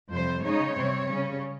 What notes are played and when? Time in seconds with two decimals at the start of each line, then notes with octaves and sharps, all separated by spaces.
0.10 F2 C3 G3 C5
0.43 C#3 G#3 D#4 C#5
0.75 C3 G3 C4
1.08 C#3 G3 C#4